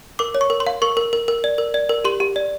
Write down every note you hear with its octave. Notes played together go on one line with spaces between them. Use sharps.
A#4 D6
C#5
C#6
A#4
C6
F5
A#4 C#6
A#4
A#4
A#4
D5
A#4
D5
A#4
G4 C6
G4
D5